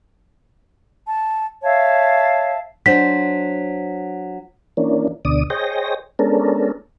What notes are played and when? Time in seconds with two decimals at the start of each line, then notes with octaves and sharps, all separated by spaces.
1.07 A5
1.62 C#5 E5 F5 A5
2.86 F#3 D4 C5 B6
4.77 E3 A#3 C#4 D4
5.25 D2 B2 D3 D5 D#6
5.50 G#4 C5 C#5 D#5 G5 A#6
6.19 G#3 B3 C#4 D4 A4 A#4